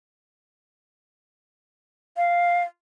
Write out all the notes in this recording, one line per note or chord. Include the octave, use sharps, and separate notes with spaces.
F5